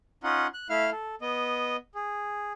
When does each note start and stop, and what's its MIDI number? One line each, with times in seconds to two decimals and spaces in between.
0.24 0.47 61
0.24 0.47 63
0.24 0.47 65
0.24 0.47 78
0.54 0.68 90
0.70 0.90 57
0.70 0.90 64
0.70 0.90 77
0.70 0.90 89
0.92 1.15 69
1.22 1.76 59
1.22 1.76 75
1.95 2.53 68